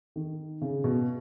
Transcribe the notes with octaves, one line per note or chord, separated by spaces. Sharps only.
D#3
C#3
B2